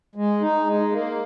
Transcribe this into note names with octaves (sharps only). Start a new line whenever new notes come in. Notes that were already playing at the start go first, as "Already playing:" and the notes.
G#3
D#4
G#3
A#3